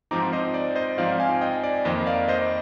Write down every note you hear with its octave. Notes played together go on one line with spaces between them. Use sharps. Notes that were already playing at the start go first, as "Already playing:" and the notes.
G#2 F3 C4 D#4 A#5 D6
C5 D#5
D5
C5 D#5
G#2 F3 C4 D#4 D5 F5
F5 G#5
D#5 G5
D5
F2 D#3 A#3 C5 D#5
D5 F5
C5 D#5